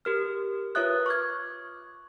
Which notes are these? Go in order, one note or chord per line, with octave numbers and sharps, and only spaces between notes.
G4 A#4 F6
F4 B4 C#5 E5 D#6 F#6
C#6 D6 F6 G#6